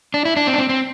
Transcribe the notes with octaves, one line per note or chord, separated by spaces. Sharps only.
D4
E4
D4
C4
D4
C4
C4